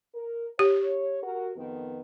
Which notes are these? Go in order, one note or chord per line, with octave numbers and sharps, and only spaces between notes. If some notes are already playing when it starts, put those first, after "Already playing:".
A#4
G4 C#5
F#4 A#4
F2 D#3 B3